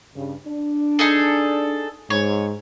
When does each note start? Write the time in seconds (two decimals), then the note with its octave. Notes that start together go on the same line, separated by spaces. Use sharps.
0.16 G2 C#3
0.47 D4
0.99 D#4 G#4 A4
2.10 G#2 C#5